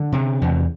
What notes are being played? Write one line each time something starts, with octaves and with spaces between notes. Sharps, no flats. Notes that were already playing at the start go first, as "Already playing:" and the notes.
Already playing: D3
C3
E2